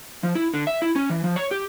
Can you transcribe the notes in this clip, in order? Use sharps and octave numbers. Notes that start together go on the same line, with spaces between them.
F3
E4
D3
E5
E4
C#4
E3
F3
C#5
G4